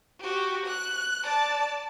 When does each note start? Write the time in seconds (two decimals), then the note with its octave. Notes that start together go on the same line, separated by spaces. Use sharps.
0.20 F#4 G4
0.66 F#6
1.23 D5 A5